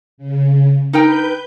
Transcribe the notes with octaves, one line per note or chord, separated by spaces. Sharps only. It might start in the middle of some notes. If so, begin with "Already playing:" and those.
C#3
D#4 A#4 B4 G5 G6